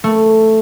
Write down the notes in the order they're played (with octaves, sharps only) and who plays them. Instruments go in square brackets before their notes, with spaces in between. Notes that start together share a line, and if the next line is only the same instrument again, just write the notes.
[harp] A3